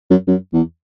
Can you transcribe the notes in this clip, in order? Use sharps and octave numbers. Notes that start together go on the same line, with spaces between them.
F#2
F#2
E2